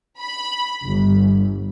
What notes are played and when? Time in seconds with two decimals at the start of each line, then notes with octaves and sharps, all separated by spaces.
0.19 B5
0.84 G1